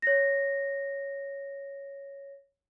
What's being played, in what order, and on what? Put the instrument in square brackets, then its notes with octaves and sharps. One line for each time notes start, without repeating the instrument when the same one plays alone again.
[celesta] C#5 A#6